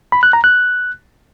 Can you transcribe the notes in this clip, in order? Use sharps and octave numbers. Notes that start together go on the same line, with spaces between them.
B5
F#6
A#5
F#6